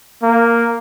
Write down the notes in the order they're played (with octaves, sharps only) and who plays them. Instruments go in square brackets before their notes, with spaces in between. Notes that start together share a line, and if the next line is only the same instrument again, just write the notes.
[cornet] A#3